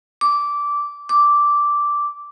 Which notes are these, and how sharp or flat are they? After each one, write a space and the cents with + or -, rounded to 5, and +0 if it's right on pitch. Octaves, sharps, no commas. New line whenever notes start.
D6 -15
D6 -5